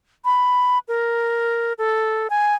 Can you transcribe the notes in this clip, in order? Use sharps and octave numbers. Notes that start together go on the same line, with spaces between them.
B5
A#4
A4
G#5